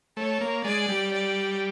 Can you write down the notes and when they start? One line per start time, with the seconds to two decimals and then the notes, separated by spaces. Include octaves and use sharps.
0.17 A3 C#5
0.41 A#3
0.64 G#3 D5
0.88 G3
1.14 D5